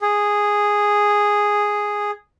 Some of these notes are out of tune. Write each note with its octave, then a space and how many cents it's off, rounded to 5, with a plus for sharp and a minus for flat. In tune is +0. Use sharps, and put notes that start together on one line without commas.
G#4 -5